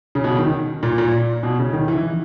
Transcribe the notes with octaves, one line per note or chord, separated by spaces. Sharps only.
C#3
B2
D#3
A#2
A#2
B2
C#3
D#3
E3
E3